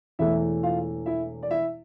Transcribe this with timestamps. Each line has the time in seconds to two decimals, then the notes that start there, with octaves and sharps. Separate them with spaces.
0.19 E1 E2 E3 A3 E4 E5
0.63 F4 F5
1.06 E4 E5
1.43 D5
1.51 E4 E5